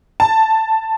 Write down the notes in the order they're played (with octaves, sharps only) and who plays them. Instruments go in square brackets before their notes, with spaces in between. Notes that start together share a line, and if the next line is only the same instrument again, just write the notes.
[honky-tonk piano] A5